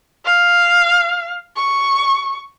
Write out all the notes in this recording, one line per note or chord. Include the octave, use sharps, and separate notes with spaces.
F5
C#6